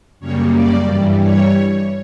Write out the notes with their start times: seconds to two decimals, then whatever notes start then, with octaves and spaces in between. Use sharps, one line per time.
0.20 F#2 C#3 G3 A#3 C#5
0.53 D5
0.88 G2 E3 G3
1.21 C#5